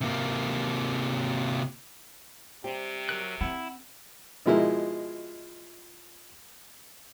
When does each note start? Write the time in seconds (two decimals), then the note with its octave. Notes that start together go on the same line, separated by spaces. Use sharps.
0.01 C3 A#3
2.64 C3 G3 C4 G4
3.09 F#3 A#4 F#6
3.41 C4 E4 F#5
4.46 B2 F3 G#3 E4 A#4